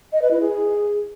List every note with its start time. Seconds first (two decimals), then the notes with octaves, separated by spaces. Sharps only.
0.12 D#5
0.22 B4
0.31 E4
0.40 G#4